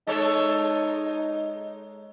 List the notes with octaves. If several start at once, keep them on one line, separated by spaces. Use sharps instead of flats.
G#3 D#4 A4 C#5